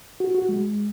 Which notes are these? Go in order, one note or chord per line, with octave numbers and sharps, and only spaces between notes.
F#4
F#4
G#3